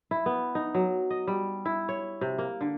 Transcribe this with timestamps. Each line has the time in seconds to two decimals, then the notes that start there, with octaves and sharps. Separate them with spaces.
0.11 E4
0.26 B3
0.55 D#4
0.74 F#3
1.10 D#5
1.27 G3
1.65 E4
1.89 C#5
2.21 C3
2.38 A#3
2.61 D3